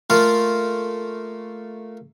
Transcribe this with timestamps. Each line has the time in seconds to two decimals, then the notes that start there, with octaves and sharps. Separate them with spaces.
0.10 A3 A#3 F4 A4 F5